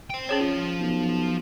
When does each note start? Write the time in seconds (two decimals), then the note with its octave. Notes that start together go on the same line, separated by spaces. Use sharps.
0.10 C5 G5
0.29 C#4 G#4 C#5
0.41 F3 F4
0.80 B1